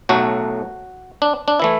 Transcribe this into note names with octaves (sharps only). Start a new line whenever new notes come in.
B1 A2 F#3 A3 F#4
D4
D4
E3 A3 E4